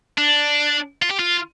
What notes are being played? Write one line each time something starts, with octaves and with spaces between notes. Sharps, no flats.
D4
F4
G4
F4